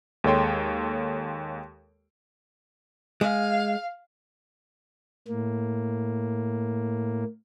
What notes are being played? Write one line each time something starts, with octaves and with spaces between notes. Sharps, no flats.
D#2 G#3 A4 C#5 G5 C6
G#3 F5
A2 A#3